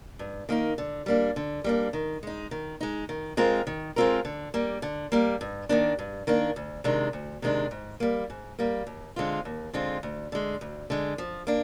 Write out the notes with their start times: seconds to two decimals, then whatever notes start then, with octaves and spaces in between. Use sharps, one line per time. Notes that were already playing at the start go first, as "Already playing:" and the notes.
0.19 G2
0.49 D#3 A#3 D#4
0.78 D3
1.06 G3 A#3 D4
1.36 D3
1.64 G3 A#3 D4
1.93 D#3
2.23 G#3 D#4
2.51 D#3
2.81 G#3 D#4
3.09 D#3
3.37 G#3 C4 F4 A#4
3.67 D#3
3.96 G#3 C4 F4 A#4
4.25 D3
4.54 G3 A#3
4.82 D3
5.12 G3 A#3
5.41 G2
5.69 D#3 A#3 D4
5.99 G2
6.27 D#3 A#3 D4
6.56 D2
6.84 C3 D#3 G#3 D4
7.13 D2
7.42 C3 D#3 G#3 D4
7.71 G#2
8.00 G3 A#3
8.30 G#2
8.59 G3 A#3
8.87 D#2
9.16 D3 G#3 C4 F4
9.45 D#2
9.73 D3 G#3 C4 F4
10.03 D2
10.32 D3 G#3
10.61 D2
10.90 D3 G#3
11.18 F3
11.47 A#3 D4